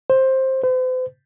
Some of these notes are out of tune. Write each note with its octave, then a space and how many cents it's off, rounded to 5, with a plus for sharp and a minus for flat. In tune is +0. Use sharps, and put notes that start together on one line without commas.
C5 +10
C5 -45